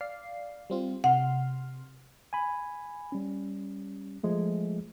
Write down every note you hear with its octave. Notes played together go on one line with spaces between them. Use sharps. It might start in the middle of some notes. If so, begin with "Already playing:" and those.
D5 F5 C7
G3 C4 F4
C3 F#5 C6 F6
G#5 B5
G3 C#4
F3 G#3 A3